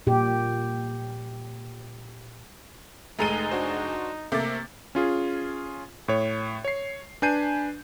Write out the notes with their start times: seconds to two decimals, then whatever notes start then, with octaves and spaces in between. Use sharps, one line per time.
0.07 A#2 G4
3.19 F1 G#3 A3 D#4 A#5 A6 D#7
3.51 D4 F#4 C5
4.32 C3 A3 A#3 D6 A6
4.95 C#4 F4 G#4
6.08 A2 C#5
6.65 C#5 C7
7.22 D4 B4 G#5 G6 C7 D#7